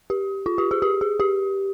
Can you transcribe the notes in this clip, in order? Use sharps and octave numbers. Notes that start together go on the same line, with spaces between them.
G4
F4
G4
G#4
G4
G#4
G4